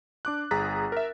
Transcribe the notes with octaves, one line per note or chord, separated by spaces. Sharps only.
D4 D6 F#6
G1 G#4 A#5 F#6 A6 B6
A#4 E5